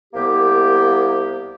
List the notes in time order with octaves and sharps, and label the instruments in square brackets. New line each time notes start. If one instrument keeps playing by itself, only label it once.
[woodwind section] C2 A#3 B3 G4